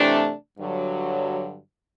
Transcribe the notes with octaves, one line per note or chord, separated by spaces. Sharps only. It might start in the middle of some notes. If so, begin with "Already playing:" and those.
Already playing: C3 E3 A3 D4
G2 D3 F#3